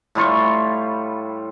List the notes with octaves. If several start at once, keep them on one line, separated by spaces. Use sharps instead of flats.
A2 G3 F4 C#6